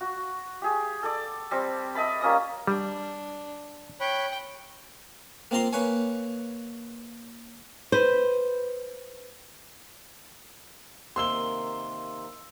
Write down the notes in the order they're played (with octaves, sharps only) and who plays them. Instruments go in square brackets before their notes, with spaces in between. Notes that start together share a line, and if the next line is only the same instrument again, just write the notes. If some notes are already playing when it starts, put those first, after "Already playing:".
[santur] F#4
G4 G#4
A4 D5
G3 C4
D#5 E5 A5 B5
G3 A#3 C#4 D#6
[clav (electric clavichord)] G3 [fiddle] D4
[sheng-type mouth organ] C#5 B5 F#6 [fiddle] G5
[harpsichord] A#3 C4 F4 A#5 C6
A#3 B4 C#5 G#5
[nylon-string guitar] B4 C5
[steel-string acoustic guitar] C3 D#3 A#3 [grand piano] C6 E6 G7